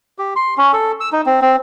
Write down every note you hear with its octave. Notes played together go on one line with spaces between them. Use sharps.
G4
C6
C#4
A4
E6
D#4
C4
C4